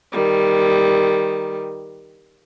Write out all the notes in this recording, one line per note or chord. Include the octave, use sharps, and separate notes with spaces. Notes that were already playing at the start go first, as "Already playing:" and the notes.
D#3 G3